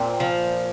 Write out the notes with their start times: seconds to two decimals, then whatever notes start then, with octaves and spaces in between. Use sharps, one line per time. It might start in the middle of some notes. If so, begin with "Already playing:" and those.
Already playing: A#2 C4
0.20 F3